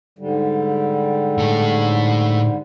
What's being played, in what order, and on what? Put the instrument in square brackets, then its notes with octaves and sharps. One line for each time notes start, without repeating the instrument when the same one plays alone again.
[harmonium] G#2 D3 G3
[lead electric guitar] A2 A4